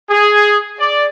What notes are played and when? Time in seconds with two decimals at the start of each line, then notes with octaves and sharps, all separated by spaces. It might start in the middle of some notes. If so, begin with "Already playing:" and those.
0.10 G#4
0.80 D5